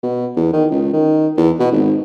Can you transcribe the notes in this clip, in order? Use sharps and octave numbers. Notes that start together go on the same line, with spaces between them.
B2
E2
D#3
C#2
D#3
E2
B2
G#1